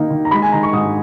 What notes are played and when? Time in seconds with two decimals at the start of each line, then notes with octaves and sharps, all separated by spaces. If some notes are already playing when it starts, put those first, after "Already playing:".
Already playing: D#3 A#3 D#4
0.10 D#3
0.25 A#5
0.31 G#3 B5
0.42 G#5
0.52 D#3 A#5
0.63 C#6
0.73 G#2 D#6